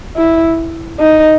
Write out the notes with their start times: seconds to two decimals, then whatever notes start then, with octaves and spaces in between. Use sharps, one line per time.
0.17 E4
1.00 D#4